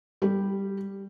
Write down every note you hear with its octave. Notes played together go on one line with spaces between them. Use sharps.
G3 G4